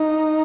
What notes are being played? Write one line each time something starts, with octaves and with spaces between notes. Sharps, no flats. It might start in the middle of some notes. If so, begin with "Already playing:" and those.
Already playing: D#4